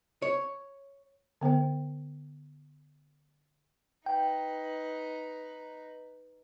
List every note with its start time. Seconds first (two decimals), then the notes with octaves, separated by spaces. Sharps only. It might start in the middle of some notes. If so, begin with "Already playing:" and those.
0.22 C#5
1.41 D3 B3 C5 G5
4.06 D#4 B4 G5